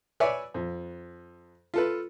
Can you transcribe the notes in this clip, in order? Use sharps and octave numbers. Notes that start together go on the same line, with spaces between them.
B4 C#5 D5 E5 G#5
F2
F4 A4 B4